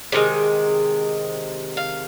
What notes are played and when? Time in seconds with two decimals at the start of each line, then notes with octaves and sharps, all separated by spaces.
0.12 C3 D#3 G#3
1.77 F5